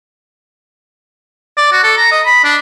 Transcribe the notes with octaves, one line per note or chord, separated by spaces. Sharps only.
D5
F#4
A4
A#5
D#5
B5
D4